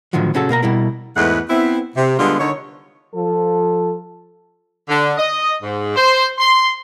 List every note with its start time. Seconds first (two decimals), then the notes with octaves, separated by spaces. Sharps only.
0.13 A2 D3 D#3 F3 F#3
0.34 A#2 C#3 C#4 F#4 A4
0.49 B2 A#3 A#4 A#5
0.63 B2 G3 E4 A#4
1.16 E2 G#2 A3 B4 D#5 F#5
1.49 B3 C4 E4
1.96 C3
2.19 D3 G3 G#3 B3 D4 F4
2.39 D3 D#3 D#4 C#5
3.15 F3 A4
4.89 D3
5.18 D#5
5.63 G#2
5.96 C5
6.38 C6